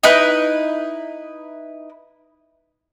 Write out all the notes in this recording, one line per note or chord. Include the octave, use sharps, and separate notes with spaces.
D#4 E4 B4 F#6